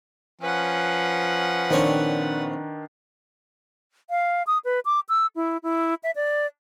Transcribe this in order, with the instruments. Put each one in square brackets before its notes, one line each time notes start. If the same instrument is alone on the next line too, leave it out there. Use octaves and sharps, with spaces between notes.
[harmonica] F3 C#4 [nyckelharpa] B4 F#5
[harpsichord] A#1 C4 C#5 [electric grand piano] D#3 D4
[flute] F5
D#6
B4
D6
E6
E4
E4
E5
D5